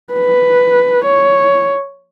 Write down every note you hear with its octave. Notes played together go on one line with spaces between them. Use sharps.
B4
C#5